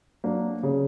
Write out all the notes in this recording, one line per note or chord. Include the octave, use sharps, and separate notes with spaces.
F#3 A#3 D4
C#3